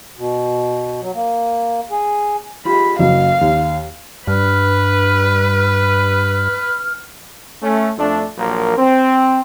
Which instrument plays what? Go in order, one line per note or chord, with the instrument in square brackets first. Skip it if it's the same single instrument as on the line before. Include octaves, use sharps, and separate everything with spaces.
[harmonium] B2
F#3
A#3
G#4
[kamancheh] G#3 B5 [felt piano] F4 G4
[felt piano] F#1 F#3 [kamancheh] F5
[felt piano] D#2
[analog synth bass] G2 [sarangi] B4 [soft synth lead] F6
[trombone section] A3 C#4
F2 A3 D4
A#1 F#3 A#3 A#4
C4